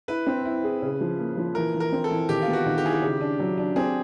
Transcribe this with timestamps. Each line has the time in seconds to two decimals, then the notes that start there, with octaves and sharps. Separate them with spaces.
0.08 E4 B4
0.27 C4
0.45 E4
0.64 G#4
0.82 C#3
1.01 F3
1.19 A#3
1.37 F3
1.55 E3 A#4
1.74 E3
1.80 A#4
1.92 C4
2.04 A4
2.11 E3
2.29 D#3 G4
2.42 F4
2.48 B3
2.53 F#4
2.66 D#3
2.78 G4
2.84 E4 G#4
2.93 G4
3.02 C#3
3.21 D4
3.39 F#3
3.58 D4
3.76 C4 G#4